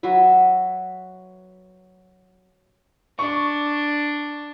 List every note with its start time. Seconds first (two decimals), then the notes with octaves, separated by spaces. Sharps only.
0.03 F#3 F#4 B4 E5
3.19 D4 C#6